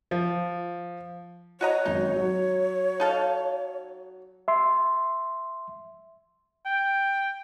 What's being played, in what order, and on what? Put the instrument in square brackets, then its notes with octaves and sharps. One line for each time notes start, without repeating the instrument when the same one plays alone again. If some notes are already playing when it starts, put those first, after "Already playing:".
[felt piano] F3
[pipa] F#4 D#5 A#5 [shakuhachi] C#5
[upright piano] G#1 F#2 [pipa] D#4
[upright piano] F#3
[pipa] D#4 A4 F5
[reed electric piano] E5 C6
[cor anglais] G5